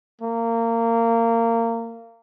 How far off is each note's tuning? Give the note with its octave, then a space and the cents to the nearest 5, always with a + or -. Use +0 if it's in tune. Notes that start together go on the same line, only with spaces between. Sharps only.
A#3 -25